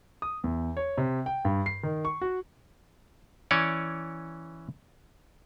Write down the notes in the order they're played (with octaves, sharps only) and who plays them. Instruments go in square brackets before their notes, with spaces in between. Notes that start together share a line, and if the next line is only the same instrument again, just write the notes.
[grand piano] D#6
E2
C#5
C3
G5
G2
C7
D#3
C#6
F#4
[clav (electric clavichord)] E3 C#4 C#5 D5